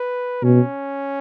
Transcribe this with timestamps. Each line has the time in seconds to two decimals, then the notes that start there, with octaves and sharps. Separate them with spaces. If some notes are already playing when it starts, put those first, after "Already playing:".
Already playing: B4
0.43 B2 C#4